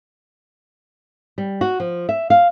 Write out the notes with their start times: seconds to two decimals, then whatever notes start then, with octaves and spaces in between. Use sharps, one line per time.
1.38 G3
1.61 F#4
1.80 F3
2.09 E5
2.30 F5